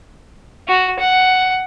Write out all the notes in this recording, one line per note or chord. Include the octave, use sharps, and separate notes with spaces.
F#4
F#5